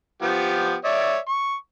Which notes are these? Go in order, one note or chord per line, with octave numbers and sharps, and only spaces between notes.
F3 B3 G4
C#5 D5 E5
C#6